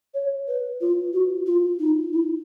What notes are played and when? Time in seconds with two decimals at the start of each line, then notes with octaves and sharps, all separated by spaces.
0.14 C#5
0.48 B4
0.81 F4
1.13 F#4
1.46 F4
1.80 D#4
2.13 E4